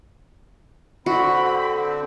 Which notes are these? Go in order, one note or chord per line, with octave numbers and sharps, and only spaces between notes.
D3 C4 F#4 B5